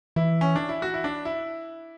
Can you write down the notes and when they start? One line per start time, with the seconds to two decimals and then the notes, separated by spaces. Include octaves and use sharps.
0.16 E3 E4
0.41 C#4
0.56 D4
0.69 E4
0.82 F#4
0.94 E4
1.04 D4
1.25 E4